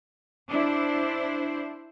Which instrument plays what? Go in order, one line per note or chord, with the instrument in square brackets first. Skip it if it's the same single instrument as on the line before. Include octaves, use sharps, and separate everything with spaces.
[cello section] D4 E4 C5